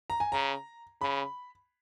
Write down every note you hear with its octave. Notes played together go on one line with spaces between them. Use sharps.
A#5
G#5
C#3 A#5
C#3 B5